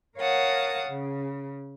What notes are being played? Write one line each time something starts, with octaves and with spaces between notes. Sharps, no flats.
A#4 C#5 F5 F#5 A5 D#6
C#3